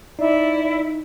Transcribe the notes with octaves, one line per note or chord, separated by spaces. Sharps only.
D#4 E4 D5 E5